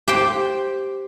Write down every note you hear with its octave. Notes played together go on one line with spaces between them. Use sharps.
G4 C5 G5